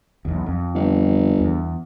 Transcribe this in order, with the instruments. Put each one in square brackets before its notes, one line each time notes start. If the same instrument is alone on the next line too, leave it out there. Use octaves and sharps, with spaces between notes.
[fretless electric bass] B1 E2
F2
[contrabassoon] G1
[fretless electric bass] E2